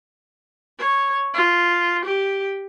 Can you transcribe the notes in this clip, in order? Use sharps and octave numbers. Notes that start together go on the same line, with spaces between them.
C#5
F4
G4